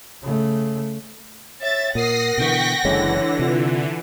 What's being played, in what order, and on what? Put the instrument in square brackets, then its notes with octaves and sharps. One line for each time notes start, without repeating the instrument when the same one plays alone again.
[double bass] C#3 A3
[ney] C#5 [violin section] E5 A6
[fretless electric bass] A#2 [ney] A#4 [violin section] F#5 A#6 [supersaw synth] D#6 C7
[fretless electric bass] B2 D3 E3 [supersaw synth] G5 C#6 B6
[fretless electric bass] F#1 G#3 C#4 [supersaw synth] D3 E3 [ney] C#5
[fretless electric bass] C3 [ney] F4